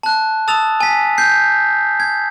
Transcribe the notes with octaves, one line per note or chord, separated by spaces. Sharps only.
A5 F#6
A5 D#6 E6 A6 F7
G#5 B6
G6 C7
G#6